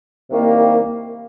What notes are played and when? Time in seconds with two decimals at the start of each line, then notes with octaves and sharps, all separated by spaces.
0.30 C2 C3 D#3 G3 A#3